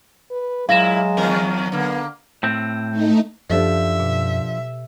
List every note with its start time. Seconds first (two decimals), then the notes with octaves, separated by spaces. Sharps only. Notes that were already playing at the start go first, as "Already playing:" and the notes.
0.31 B4
0.69 A#2 F#3 G#3 E4 F5 A#6 E7
1.17 E2 D#3 A#4
1.72 D3 A#3 B3
2.43 A2 C4
2.90 A3 D#4
3.50 F#2 F3 D4 G4 A4 E5
4.00 B2